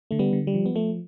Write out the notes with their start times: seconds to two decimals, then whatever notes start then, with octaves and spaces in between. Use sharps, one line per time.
0.11 D3 A3
0.19 G3 B3
0.33 D3
0.47 G3
0.54 F3
0.66 B3
0.76 F3 A3